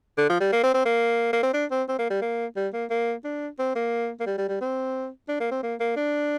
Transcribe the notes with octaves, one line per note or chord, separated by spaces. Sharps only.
D3
F3
G3
A#3
C4
C4
A#3
A#3
C4
D4
C4
C4
A#3
G3
A#3
G3
A#3
A#3
D4
C4
A#3
A#3
G3
G3
G3
C4
D4
A#3
C4
A#3
A#3
D4